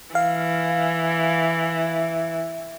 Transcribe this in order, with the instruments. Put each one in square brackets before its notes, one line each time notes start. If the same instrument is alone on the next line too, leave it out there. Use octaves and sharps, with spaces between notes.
[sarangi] E3 [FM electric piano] F5